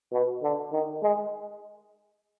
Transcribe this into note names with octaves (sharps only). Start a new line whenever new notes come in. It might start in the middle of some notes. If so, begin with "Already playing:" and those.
B2
D3
D#3
G#3